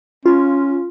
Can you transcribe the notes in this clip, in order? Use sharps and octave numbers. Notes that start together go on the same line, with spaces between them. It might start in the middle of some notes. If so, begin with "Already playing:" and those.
C#4 F4